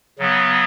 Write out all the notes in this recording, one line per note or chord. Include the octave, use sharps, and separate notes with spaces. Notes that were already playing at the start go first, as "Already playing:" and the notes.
C#3 F#3 B3